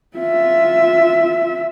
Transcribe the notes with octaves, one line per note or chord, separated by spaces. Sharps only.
F4 E5